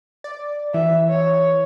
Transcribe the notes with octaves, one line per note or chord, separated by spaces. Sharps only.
D5
E3 E5
C#5